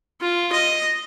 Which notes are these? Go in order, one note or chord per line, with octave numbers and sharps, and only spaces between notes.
F4
D#5